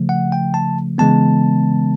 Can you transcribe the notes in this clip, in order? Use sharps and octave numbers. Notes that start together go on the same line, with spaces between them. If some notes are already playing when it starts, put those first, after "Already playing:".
Already playing: C#3 F3 A3
F#5
G5
A5
C#3 E3 G#3 B3 A5